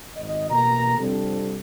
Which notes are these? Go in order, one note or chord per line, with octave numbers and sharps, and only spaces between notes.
G#1 D#5
A1 B2 A#3 A#5
F2 C3 G3 C4 D4 A4